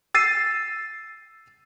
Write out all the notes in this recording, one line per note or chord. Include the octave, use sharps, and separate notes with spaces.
E6 A6 C7 D#7